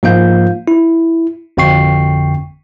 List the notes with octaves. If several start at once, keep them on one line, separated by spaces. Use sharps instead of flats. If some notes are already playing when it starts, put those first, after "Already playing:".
G#2 F3 A#3 F4 F5 G6
E4
G#1 F2 D3 G5 C#6 C7